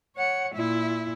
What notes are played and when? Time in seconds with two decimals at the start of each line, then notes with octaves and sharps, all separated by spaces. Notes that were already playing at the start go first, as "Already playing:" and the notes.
0.16 C#5 F#5
0.55 A#2 E4